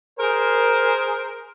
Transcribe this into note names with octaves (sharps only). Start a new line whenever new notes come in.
G#4 A#4 C5